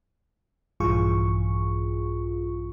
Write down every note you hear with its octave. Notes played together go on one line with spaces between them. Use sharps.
A#1 G2 E3 F4 G#4 C#6